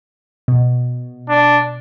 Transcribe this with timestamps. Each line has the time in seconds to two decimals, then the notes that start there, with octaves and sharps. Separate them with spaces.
0.48 B2
1.30 D4